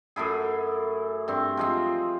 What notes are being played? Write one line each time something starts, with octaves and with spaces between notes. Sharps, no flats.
F#2 A3 E4 G#4
G2 C4
F3 G#3 C4